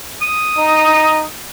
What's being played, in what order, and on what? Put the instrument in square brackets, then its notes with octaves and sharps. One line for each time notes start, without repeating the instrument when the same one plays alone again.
[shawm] D#6
[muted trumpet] D#4